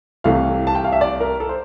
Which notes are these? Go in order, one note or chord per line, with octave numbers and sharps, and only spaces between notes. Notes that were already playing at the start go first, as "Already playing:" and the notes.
C2 C3 E3 A3 F5
A5
G5
F5
E5
D5
A#4
A4
C5